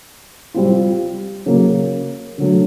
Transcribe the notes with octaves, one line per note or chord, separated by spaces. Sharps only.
G3 C4 F4
C#3 F#3 A#3
D3 F#3 A3